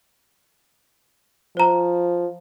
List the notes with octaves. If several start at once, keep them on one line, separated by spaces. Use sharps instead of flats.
F3 C5 A#5